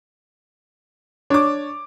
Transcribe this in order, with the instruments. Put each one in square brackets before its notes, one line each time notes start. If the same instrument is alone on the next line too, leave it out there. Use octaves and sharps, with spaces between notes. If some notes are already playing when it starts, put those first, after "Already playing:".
[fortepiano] D4 [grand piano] C#5 D6